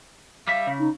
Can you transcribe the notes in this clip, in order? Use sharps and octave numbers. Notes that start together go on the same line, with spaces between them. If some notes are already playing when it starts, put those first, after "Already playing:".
G3 E5 F5
C#3
D#4